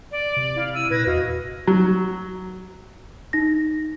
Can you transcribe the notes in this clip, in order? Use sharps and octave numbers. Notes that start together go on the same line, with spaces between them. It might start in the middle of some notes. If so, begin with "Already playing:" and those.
D5
C3
E4 F5
E6 D#7
A#2 B4 G#6 A#6
E2 F#4 D#5 F5
F#3
D#4 A#6